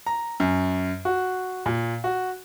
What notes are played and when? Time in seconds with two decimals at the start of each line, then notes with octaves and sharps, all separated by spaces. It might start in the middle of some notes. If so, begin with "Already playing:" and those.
0.06 A#5
0.40 F#2
1.05 F#4
1.66 A#2
2.04 F#4